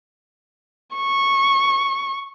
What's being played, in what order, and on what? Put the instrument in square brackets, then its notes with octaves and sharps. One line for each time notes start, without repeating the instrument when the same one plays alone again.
[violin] C#6